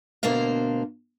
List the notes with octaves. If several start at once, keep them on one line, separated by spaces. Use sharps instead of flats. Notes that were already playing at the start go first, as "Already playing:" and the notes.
D2 B2 A#3 D4 C5 F5